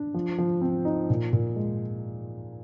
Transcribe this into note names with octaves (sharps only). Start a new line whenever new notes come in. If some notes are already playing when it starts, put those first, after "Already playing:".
Already playing: D4
F3
F3
C4
D#4
A#2
A#2
G#3